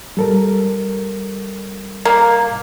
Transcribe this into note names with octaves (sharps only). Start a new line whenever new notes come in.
G3 A4 A#4
A#3